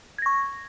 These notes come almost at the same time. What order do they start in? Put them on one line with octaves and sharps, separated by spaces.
G#6 A#6 C#6